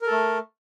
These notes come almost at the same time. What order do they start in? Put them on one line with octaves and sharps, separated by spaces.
A#4 A4 A3